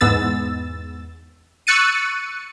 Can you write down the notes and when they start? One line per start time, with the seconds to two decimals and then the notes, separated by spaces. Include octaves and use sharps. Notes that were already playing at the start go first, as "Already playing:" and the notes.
0.01 E2 G#2 G#3 B3 E6 A6
1.67 C#6 E6 F#6 A6 C#7 D#7